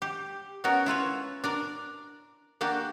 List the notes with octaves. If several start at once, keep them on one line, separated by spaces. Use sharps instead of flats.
G4
B3 C#4 F#4 A#4
E4 F4 B4 C#5
D4 A#4 D5
A#3 D4 F#4 G4